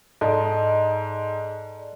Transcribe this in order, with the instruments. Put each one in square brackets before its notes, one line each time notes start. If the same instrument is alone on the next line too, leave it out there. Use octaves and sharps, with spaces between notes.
[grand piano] G#2 [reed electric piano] A4 D#5 A5 [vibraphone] D5